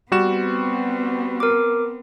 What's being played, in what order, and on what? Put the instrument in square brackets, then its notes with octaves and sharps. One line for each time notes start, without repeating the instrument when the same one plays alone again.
[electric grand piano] G3 F#4 E7 [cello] B3 C4
[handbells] A#4 D6